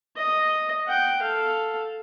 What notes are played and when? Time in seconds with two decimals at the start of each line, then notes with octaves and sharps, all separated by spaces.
0.16 D#5
0.87 F#5 G5
1.22 A4 F5